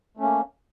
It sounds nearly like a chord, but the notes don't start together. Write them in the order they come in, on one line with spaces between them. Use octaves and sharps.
A3 C#4 A#3